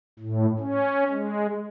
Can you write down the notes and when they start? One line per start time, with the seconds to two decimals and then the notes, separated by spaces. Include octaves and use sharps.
0.19 A2
0.59 C#4
1.10 G#3